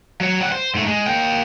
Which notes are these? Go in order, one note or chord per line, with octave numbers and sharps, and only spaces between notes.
F#3 C#5
G3 F#5
C5
G#2 A3
G#3
A#3 G5